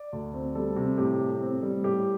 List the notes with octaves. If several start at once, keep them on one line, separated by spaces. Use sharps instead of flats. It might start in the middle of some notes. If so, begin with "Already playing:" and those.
Already playing: D5
D2
C4
G3 A4
C3
A2 G4
A2
C4
G3
A2 G4